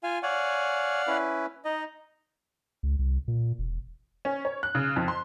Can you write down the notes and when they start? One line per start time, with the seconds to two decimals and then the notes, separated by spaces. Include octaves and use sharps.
0.03 F4 F5 G#5
0.23 C#5 D5 F5 F#5 G#5
1.07 C#4 E4 B4
1.65 D#4 D#5
2.83 C#2
2.99 C2
3.28 A#2
3.59 E1
4.25 C#4
4.45 C#5
4.63 F#6
4.75 C#3
4.96 F2
5.08 C6